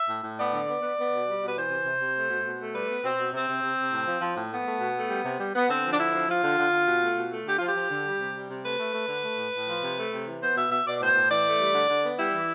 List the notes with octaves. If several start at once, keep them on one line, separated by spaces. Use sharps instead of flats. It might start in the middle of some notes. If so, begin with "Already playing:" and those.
Already playing: E5
A2
A2
B3 D5
D3
B3
B3
B3
B2
G3
B2 B4
E3 C5
C3
C3
C3
A3
B2
B2
A3
G3 B4
B3
B2 C4
B2
C3 C4
C3
C3
C3
A2
F3
F3
A2
A3 B3
A3
B2
A3
G3
C3
G3
B3
D3 C4
F3
D4
D3 E4
F3
F3 F4
D3
D3
D3
B2
A3
B2
A3
D3 G4
F3 F4
G4
F3
D3
G3
C3
G3
C3
A3 B4
A3
A3
D3
A3
A2
A2
F3
C3
A3
C3
E3
B3 C5
B2 E5
B2 E5
B2 D5
A2 C5
A2
E3 D5
A3
G3
D3
D3
B3
G3 E4
E3